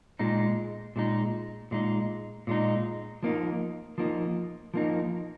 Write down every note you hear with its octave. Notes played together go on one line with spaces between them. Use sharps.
A#2 G#3 D#4
A#2 G#3 D#4
A#2 G#3 D#4
A#2 G#3 D#4
F3 A#3 D#4
F3 A#3 D#4
F3 A#3 D#4